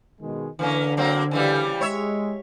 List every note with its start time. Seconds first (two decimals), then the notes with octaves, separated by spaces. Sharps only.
0.20 B2 D#3 G#3
0.59 D3 E3 A#3 C#4
0.97 F#3 A#3 C4
1.31 C#3 E3 G3
1.81 G#3 C#5 E5